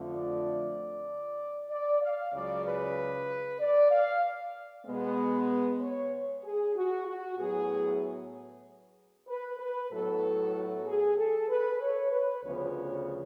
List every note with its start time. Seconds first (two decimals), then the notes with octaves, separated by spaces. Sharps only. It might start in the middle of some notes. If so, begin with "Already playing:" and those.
Already playing: F2 D3 F3 A3
0.11 D5
1.70 D5
2.02 F5
2.33 C#2 C#3 F#3 D5
2.64 B4
3.59 D5
3.90 F5
4.86 B2 G#3 B3
5.49 B4
5.80 C#5
6.44 G#4
6.75 F#4
7.07 F#4
7.38 A2 F#3 B3 G#4
9.28 B4
9.59 B4
9.91 A2 F#3 B3 A4
10.53 F#4
10.85 G#4
11.17 A4
11.49 B4
11.80 C#5
12.11 B4
12.43 D2 C#3 F3 B3 C#5